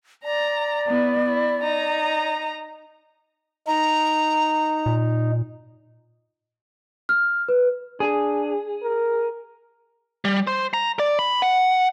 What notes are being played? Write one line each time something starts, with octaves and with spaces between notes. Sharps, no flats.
D5 A#5
B3 E4
E4
D#4 A#5
D#4 A#5
A#2
F6
B4
D4 G#4
A#4
G3
C5
A#5
D5
B5
F#5